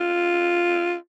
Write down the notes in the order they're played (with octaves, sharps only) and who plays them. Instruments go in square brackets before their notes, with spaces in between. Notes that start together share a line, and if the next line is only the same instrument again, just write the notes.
[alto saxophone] F4